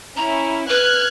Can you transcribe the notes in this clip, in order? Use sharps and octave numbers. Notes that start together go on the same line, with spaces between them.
C#4 E4 A#5
B4 F6 F#6 G#6